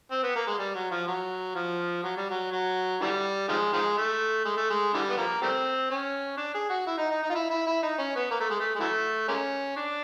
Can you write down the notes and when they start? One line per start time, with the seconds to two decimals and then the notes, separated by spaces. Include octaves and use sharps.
0.11 C4
0.23 B3
0.35 A#3
0.47 G#3
0.59 G3
0.75 F#3
0.91 F3
1.07 F#3
1.55 F3
2.03 F#3
2.17 G3
2.30 F#3
2.52 F#3
3.01 D3 E3 G3
3.49 D#3 F3 G#3
3.73 D#3 F3 G#3
3.98 A3
4.45 G#3
4.57 A3
4.70 G#3
4.94 D3 E3 G3
5.10 B3
5.17 F3 G3 A#3
5.42 G3 A3 C4
5.90 C#4
6.38 D4
6.55 G#4
6.70 F#4
6.87 E4
6.98 D#4
7.10 D#4
7.23 D#4
7.30 F4
7.35 E4
7.50 E4
7.67 E4
7.83 D#4
7.98 C#4
8.16 B3
8.31 A#3
8.40 A3
8.50 G#3
8.60 A3
8.75 G#3
8.80 E3 F#3 A3
9.28 G#3 A#3 C#4
9.76 D4